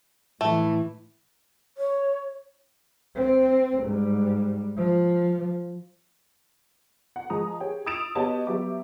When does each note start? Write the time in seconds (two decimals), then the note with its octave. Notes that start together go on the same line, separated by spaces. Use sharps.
0.41 A2 E3 A3
1.78 C#5
3.16 C4
3.83 G#2 G3
4.77 F3
7.16 F#5
7.30 F3 G#3 A#5 D#6
7.60 G4 G#4 C#5 G5
7.86 D#6 E6 A6 D7 E7 F7
8.15 B3 F#4 G4 C#5 D#5 A5
8.47 F#3 B3 G4 E5 D6